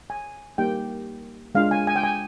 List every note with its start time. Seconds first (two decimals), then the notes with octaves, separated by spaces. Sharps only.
0.10 G#5
0.58 G3 A#3 D#4 G4 G5
1.55 G#3 D4 F4 F5
1.71 G#5
1.87 G#5
1.96 G5
2.03 G#5